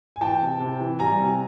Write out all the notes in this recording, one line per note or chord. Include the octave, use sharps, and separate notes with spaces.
G#5
E3 G5 A5
C3
C3
E3
G3 G#5 A#5
C3